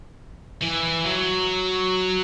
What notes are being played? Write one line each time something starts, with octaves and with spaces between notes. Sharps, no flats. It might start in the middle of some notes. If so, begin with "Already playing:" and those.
E3
F#3